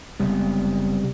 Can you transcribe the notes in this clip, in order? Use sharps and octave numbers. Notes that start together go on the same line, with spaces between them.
F#1 C3 G3 G#3 B3